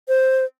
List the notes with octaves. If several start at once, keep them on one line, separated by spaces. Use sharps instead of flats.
C5